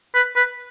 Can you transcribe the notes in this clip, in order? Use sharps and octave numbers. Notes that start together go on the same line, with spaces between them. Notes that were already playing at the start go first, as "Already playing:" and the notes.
B4
B4